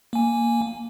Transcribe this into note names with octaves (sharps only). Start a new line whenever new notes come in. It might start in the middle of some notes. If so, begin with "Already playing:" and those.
A#3 G#5